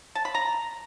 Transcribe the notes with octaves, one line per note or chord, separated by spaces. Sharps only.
A5
B5
A#5